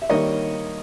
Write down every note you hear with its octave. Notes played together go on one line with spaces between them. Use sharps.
E5
D#3 G3 A#3 C#5 D#5